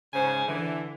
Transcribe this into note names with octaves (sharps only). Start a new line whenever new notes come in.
G#2 C#3 C5 G#5
D3 E3